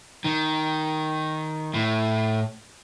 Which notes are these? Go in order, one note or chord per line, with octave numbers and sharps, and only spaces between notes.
D#3
A2